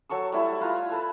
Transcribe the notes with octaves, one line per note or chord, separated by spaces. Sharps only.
F#3 A4 C#6 E6
G3 A3 E4
E4 F4 B4 A#5
A4 B4 B5